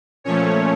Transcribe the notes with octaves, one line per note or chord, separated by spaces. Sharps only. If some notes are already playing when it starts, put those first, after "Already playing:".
A#2 F3 A3 C#4 C#5